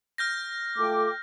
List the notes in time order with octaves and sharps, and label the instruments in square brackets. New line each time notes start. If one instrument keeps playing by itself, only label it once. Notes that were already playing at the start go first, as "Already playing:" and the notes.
[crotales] F6 G6 A#6
[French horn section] A3 F4 A4 [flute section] G5 D6